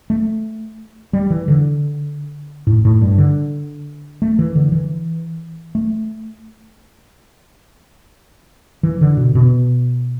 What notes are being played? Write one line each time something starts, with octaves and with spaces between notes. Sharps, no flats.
A3
G3
E3
D3
A2
A2
G2
D3
A3
E3
D3
E3
A3
E3
D3
B2
B2